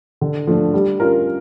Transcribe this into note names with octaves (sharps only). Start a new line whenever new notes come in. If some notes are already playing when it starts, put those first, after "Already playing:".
D3
F3 A3 D4
G3
C#4 F4 A#4